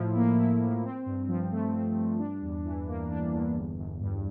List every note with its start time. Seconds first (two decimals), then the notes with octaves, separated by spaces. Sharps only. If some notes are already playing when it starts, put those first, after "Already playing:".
Already playing: A2 F3 E4
0.16 A#3
0.37 E4
0.61 A2
0.84 C4
1.06 G2
1.28 F3
1.52 A3
1.74 C4
1.96 G2
2.19 D4
2.42 E2
2.65 E3
2.88 A#3
3.10 D4
3.33 E2
3.55 G1
3.78 G1
4.01 G2